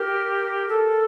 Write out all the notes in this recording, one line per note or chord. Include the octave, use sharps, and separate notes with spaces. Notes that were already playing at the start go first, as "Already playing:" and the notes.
Already playing: G4 A#4
A4